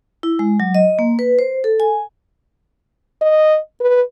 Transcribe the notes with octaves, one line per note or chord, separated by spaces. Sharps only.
E4
G#3
F#3
D#5
A#3
B4
C5
A4
G#5
D#5
B4